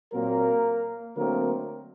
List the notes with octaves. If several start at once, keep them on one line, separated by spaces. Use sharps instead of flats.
A#2 F#3 A#3 C4 A#4
D3 F#3 A3 A#3 C4 A#4